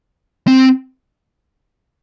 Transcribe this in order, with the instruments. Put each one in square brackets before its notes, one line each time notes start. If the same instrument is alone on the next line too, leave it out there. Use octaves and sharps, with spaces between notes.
[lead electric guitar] C4